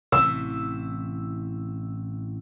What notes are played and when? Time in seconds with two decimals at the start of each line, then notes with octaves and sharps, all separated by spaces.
0.12 A1 C3 E3 E6